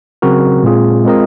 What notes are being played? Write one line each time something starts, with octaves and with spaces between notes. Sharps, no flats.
C#3 F#3 C4 F#4 A#4
A#2 G#3 C4 F4 G#4
G#3 C4 F4 A#4 D#5